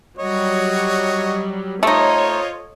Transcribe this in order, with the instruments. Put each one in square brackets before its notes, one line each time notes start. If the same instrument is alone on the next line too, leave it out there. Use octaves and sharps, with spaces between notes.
[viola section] F#3 G3 [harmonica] F#4 C#5 D#5
[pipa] A3 D#4 [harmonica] F4 C5 [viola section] A4 C#5 D#5